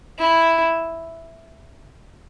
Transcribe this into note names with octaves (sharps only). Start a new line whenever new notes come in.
E4